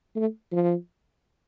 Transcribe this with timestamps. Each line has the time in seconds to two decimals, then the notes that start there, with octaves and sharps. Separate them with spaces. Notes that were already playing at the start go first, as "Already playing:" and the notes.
0.16 A3
0.52 F3